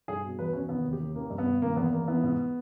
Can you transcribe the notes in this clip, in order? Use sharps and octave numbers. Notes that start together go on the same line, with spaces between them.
G2 G#4
B2
E2 B4
E2 C#4
D#3 B3
D#2
G4
D#2
D#3 A#3
G2
B3
G2
D#3 A#3
E2 B3
E2 A#3
E3 B3
G#2